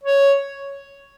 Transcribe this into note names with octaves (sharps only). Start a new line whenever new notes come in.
C#5